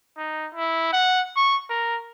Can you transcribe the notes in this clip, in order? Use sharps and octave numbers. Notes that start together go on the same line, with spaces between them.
D#4
E4
F#5
C#6
A#4